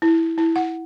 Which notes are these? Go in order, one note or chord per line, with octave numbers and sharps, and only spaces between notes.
E4
E4
F#5